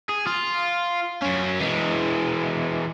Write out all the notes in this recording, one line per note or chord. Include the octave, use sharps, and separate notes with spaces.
G#4
F4
F#2 C#4
E3 G#3